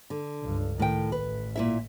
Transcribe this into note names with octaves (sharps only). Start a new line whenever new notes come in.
D3
C#2 G2
A2 D#3 G5
A1 B4
A#2 E4 E5